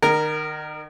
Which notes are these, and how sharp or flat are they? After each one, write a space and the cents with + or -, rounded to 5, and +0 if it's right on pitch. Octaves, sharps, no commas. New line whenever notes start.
D#3 -35 A#4 +0